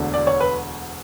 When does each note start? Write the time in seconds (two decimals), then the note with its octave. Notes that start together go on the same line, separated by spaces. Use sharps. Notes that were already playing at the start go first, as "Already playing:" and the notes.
Already playing: E1 D2 D3
0.14 D5
0.27 C#5
0.40 B4